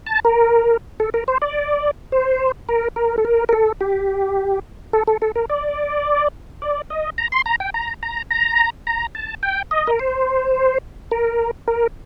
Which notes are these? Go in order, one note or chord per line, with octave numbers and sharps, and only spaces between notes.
A5
A#4
A4
A#4
C5
D5
C5
A#4
A#4
A4
A#4
A#4
A4
G4
A4
A4
A4
A#4
D5
D5
D#5
A#5
C6
A#5
G5
A#5
A#5
A#5
A#5
A5
G5
D#5
A#4
C5
A#4
A#4